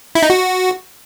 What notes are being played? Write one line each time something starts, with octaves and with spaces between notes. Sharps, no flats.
E4
D#4
F#4